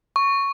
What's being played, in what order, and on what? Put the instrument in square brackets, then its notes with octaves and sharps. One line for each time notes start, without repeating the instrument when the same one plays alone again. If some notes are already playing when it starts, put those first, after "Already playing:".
[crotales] C#6